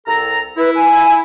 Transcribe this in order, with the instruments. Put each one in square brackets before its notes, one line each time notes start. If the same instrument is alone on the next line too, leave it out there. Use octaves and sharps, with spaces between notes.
[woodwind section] C2 A4 A#5
[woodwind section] E4 [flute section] B4
[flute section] G#5